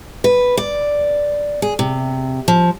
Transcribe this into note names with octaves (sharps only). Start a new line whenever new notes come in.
B4
D5
G#4
C3
F3